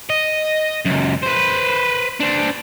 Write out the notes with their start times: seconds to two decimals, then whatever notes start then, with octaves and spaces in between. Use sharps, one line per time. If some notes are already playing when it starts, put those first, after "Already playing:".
0.10 D#5
0.85 C#2 F#2
1.23 B4 C5
2.20 D4 C5